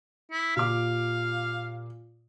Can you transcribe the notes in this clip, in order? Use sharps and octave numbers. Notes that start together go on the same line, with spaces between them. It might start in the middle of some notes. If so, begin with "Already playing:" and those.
E4
A#2 G4 F5 D6